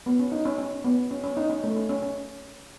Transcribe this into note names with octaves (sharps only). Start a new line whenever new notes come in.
B3
C#4
D#4
C#4
C#4
B3
C#4
C#4
D#4
C#4
A3
C#4
C#4
C#4